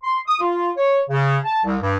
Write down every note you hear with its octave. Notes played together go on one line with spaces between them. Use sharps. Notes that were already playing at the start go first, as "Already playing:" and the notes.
C6
D#6
F4
C#5
C#3
A5
C2
G2